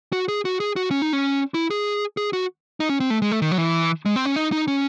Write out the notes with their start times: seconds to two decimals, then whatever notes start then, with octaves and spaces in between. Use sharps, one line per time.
0.13 F#4
0.28 G#4
0.45 F#4
0.60 G#4
0.76 F#4
0.91 C#4
1.02 D#4
1.13 C#4
1.54 E4
1.70 G#4
2.17 G#4
2.33 F#4
2.80 D#4
2.89 C#4
3.00 C4
3.10 A3
3.22 G#3
3.32 A3
3.42 D#3
3.51 F#3
3.58 E3
4.06 G#3
4.16 C4
4.26 C#4
4.36 D#4
4.52 D#4
4.68 C#4